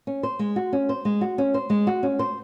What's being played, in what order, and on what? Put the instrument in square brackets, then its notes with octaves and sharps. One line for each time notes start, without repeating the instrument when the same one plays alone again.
[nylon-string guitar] C#4
C5
G#3
F#4
C#4
C5
G#3
F#4
C#4
C5
G#3
F#4
C#4
C5